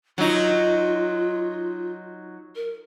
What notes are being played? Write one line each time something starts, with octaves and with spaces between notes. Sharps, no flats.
F#3 D#4 F4
A#4